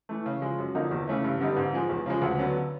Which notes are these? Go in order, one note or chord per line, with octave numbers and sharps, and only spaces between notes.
E3 A3
C#3
F3 G#3
F#2
D3 F3 A#3 D#4
E2
C#3 E3 A3 C#4
G2
D3 G3 B3 D#4
G#2
F3 G#3
E2
C#3 F3 G#3
D2
D3 F#3 B3